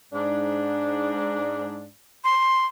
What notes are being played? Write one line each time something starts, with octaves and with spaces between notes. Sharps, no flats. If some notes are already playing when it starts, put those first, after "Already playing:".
G#2 D4
C6